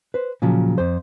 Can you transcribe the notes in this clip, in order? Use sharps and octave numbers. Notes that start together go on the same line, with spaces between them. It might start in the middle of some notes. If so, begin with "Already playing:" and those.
B4 C5
A#2 C#3 F3 F#3
F2 C5